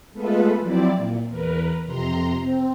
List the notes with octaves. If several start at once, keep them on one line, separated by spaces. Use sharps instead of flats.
G#3 A3 B3 F4 A4 B4
F3 F#3 C4 E4 D5
A#2
E2 A#4 B4
F2 C3 A#5 C6
C4